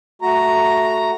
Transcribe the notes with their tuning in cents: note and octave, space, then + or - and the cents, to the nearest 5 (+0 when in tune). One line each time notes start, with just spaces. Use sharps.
A3 +0 F#4 +0 A#5 +0